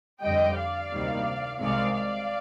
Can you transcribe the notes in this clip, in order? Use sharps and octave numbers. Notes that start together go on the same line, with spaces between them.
F2 D3 G3 D#5 G5
D5 F5
D2 C3 D#3 G3 A#3
C2 C3 D#3 G#3 D5 F5
D5 F5